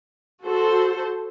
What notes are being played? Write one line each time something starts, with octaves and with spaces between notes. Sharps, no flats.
F#4 A4 C5